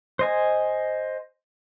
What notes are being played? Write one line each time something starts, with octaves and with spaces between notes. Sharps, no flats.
C5 D#5 G#5